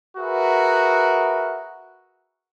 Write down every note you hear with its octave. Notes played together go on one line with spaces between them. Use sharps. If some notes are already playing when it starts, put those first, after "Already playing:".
F#4 G#4 A#4 B4 E5 F#5